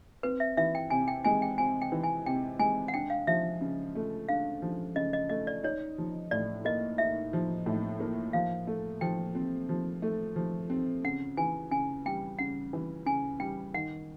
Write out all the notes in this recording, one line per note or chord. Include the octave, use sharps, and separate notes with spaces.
C4 B4
E5
E3 E5
G5
C3 G#5
G5
G#3 G#5
G5
C4 G#5
G5
E3
G#5
C3 G5
G#3 G#5
F#5
D4 G5
F5
F3 E5
C#3
A3
D4 F5
F3
C#3 D#5
D#5
A3 D#5
D5
D#4 C#5
F3
A2 D5
A#3 D#5
D#4 E5
F3
A2
A#3
F3 F5
A3
F3 G5
C4
F3
A3
F3
C4
C#3 F#5
E3 G#5
C#3 G#5
G3 G5
C#3 F#5
E3
C#3 G#5
G3 G5
D#3 F#5